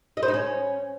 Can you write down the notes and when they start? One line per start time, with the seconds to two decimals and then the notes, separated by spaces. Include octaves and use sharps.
0.17 D#5
0.23 C5
0.28 D#4
0.34 C#4